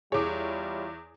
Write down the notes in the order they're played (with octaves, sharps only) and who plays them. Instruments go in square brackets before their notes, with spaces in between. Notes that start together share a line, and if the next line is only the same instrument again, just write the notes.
[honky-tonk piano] E2 C#5 [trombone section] G3 E4 F4 [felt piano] G#4 D6